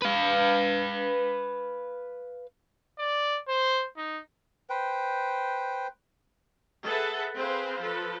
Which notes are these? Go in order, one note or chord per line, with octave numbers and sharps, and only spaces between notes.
B4 F5
D5
C5
D#4
B4 C5 G5
G#4 A4 B4 E5 F#5 A5
C4 G#4 B4 C5 F5
F3 A4 B4